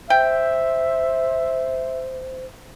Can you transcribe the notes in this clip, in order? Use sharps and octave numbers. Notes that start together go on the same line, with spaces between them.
C5 E5 G5